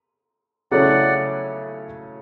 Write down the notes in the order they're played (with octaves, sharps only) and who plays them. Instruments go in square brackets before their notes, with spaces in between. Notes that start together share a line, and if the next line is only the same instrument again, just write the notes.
[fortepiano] C#3 F#3 A3 C#4 E4 [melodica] D5 F#5